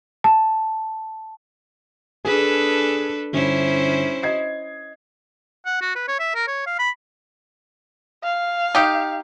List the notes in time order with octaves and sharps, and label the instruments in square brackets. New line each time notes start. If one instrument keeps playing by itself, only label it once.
[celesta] A5
[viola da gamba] D4 A4 B4 [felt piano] G#4
[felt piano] G1 [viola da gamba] C#4 E4 C5
[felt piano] D#5 G#6 C7
[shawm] F#5
F#4
B4
C#5
E5
A#4
C#5
F5
B5
[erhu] F5
[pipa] D#4 G4